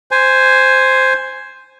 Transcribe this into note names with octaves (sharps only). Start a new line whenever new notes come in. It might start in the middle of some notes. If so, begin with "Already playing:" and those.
C5 G#5